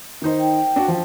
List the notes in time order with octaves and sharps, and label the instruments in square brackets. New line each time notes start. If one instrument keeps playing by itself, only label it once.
[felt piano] D#3 D#4 C5
[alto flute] G5
[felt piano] D4 F#4
F3